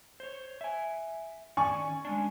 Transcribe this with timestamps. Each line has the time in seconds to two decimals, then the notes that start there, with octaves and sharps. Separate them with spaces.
0.20 C5 C#5
0.61 E5 G#5
1.57 D#3 C#4 D5 G#5 C#6
2.05 G#3 C#4 D4